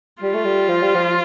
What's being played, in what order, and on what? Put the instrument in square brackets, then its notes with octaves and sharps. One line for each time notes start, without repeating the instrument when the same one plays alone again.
[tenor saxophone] G3 [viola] F4
[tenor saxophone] A3
G3
F3
G3
F3